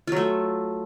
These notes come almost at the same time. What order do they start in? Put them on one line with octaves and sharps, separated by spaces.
F4 F#3 A3